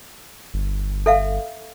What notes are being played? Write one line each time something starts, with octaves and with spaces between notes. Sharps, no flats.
G1
A4 E5 F5